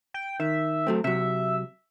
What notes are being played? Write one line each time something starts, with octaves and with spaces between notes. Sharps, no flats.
G5
D#3 E5
F#3 A3 C4
C3 F#3 E5